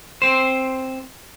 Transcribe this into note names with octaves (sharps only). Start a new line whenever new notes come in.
C4 C5